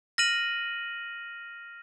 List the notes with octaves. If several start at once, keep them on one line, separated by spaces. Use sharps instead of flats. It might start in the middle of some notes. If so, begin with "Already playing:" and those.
F6 A#6 D#7 F#7